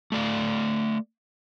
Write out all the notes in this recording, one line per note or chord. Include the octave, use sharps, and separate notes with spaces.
A3 D5 F5